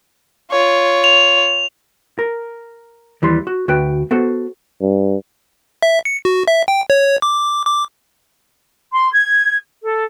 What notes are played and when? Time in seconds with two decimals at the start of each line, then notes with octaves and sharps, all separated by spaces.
0.51 F4 C#5
1.04 F7
2.19 A#4
3.22 D#2 E3 G3 C6
3.47 F#4
3.68 D2 F#4 B4 G5
4.11 B3 F#4 A4 C5
4.82 G2
5.82 E5
6.05 C#7
6.25 F#4
6.48 E5
6.68 G5
6.90 C#5
7.22 D6
7.66 D6
8.92 C6
9.12 G#6
9.83 A4